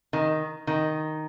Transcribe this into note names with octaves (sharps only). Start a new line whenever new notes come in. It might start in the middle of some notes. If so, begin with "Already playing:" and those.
D#3
D#3